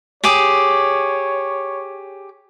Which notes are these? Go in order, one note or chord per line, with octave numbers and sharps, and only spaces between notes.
G4 G#4 C#5 D6